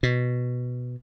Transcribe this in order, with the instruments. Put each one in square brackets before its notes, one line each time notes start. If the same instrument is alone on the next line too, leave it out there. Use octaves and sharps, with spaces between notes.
[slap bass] B2